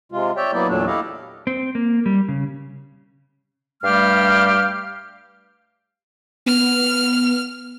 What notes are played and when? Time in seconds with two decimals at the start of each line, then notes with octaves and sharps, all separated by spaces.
0.12 C3 G#3 F4
0.37 C#5 D5 E5 G5
0.53 F#3 A#3 B3 E4 D5
0.68 E2 A#2 F#3 A3 D4
0.86 E4 G4 A4 D#5 F5
1.47 C4
1.75 A#3
2.06 G3
2.28 C#3
3.83 G2 G3 A3 G4 F5 F6
6.46 B3 F6